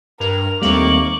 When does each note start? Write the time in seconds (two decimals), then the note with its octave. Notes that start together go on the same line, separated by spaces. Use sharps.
0.20 G2 A#4 F7
0.62 D#2 G3 A3 A#3 C4 C#6 D6 F#7